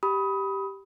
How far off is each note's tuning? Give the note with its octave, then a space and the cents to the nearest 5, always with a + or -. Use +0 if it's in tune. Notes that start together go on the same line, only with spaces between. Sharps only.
G4 -5 B5 +0 D#6 +25